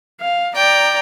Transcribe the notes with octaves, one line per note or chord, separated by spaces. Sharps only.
F5
D5 G5 A#5